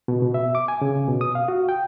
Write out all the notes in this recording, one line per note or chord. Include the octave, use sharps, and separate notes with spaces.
B2
B2
E5
D6
G#5
C#3
B2
D#6
F5
F#4
G5